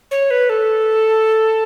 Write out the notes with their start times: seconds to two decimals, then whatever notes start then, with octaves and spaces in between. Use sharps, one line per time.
0.11 C#5
0.31 B4
0.49 A4